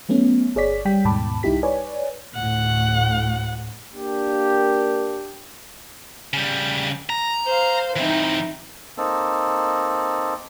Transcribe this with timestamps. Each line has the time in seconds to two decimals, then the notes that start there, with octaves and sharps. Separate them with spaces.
0.09 F#3 A3 B3 C#4
0.55 G1 G#4 C#5 D5 B6
0.85 G3 G5 B6
1.05 D#2 G#2 B2 A5 B5 D6
1.43 C2 G3 D#4 E4 G4 B6
1.63 B4 C#5 D5 G#5
2.35 D2 A2 F#5
3.94 A#3 D4 G4
6.33 C#3 G3
7.10 A#5
7.45 C5 F5
7.96 E3 C4 D#4 E4
8.97 A#3 C4 D#4 A4